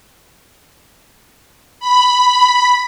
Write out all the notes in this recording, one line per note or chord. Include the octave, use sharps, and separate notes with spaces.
B5